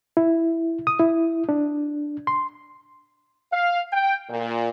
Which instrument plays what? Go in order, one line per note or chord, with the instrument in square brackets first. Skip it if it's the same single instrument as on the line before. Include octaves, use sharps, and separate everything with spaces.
[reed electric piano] E4
D#6
E4
D4
C6
[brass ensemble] F5
G5
A#2